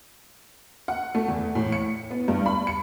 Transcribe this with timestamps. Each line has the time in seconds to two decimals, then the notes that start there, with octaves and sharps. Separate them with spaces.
0.88 F#5
1.15 A3
1.28 E2
1.55 A2
1.72 C#7
2.11 B3
2.28 G2
2.46 B5
2.67 C#7